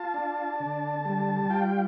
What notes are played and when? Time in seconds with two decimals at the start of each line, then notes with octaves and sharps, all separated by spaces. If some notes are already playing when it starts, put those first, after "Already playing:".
Already playing: F4 A5
0.14 D4
0.60 D3
1.05 G3
1.50 F4 G5